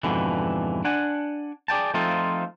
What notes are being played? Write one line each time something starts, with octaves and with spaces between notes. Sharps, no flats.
F2 G#2 B2 D3 E3
D4 F#5 G#5
G#4 D5 G5 A5
F3 A3 C4 D#4 F4 A4